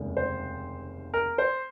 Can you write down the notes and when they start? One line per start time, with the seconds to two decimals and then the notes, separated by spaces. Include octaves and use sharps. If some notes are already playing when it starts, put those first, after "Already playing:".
Already playing: F1 D#2 C#3 G#3
0.17 C5
1.14 A#4
1.38 C5